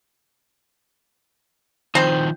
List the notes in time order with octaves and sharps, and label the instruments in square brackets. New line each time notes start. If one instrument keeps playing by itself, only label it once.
[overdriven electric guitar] D#3 F3 [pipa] C4 C5